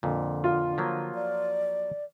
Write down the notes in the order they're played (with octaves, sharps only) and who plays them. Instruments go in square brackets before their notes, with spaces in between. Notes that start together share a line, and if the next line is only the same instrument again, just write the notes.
[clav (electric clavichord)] F2 A#2 [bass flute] D3
[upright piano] F4
[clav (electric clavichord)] F3 F#3 A#3
[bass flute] D5